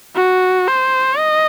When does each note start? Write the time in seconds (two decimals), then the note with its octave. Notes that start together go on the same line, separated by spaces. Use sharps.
0.16 F#4
0.67 C5
1.18 D#5